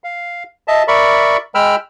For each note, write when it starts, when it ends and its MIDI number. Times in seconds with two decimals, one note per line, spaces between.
0.04 0.43 77
0.68 0.83 75
0.68 0.83 76
0.68 0.83 81
0.88 1.37 70
0.88 1.37 74
0.88 1.37 76
0.88 1.37 83
0.88 1.37 85
1.55 1.76 56
1.55 1.76 79
1.55 1.76 83
1.55 1.76 88
1.55 1.76 89